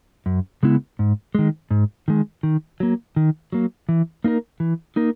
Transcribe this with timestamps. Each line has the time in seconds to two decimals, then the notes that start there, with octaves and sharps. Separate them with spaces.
0.26 F#2
0.63 C#3 G#3 B3 E4
0.99 G#2
1.35 D#3 G#3
1.71 G#2
2.08 D#3 G#3
2.43 D#3
2.80 F#3 A#3
3.16 D#3
3.53 F#3 A#3
3.89 E3
4.24 A#3 D#4 A#4
4.60 E3
4.96 A#3 D#4 A#4